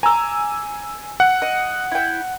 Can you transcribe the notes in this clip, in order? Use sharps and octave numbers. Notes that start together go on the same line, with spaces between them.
G#5 A#5 D6 E6
F#5
D#5
E4 G5